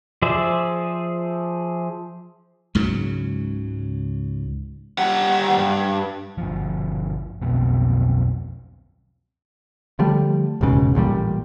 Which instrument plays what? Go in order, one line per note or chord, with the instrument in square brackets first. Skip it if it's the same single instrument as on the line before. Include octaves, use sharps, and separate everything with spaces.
[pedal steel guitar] F3 G#4 C5 D5 E5
[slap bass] C#2 G#2 C#3 F#3
[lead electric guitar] G3 F#5
G2
[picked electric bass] G1 F3
B1 F2 B2
D3 F3 G3 A3
E1 C#2 G#2 C#3
A1 A#2 E3 G3